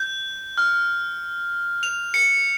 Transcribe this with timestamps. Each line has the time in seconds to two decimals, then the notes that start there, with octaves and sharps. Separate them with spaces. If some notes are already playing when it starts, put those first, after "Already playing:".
Already playing: G6
0.58 F6
1.83 F7
2.14 C#7